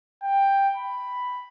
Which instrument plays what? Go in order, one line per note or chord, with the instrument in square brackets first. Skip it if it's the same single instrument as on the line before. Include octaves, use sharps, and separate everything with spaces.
[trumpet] G5
B5